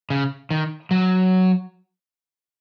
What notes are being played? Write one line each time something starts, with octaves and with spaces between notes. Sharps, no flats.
C#3
D#3
F#3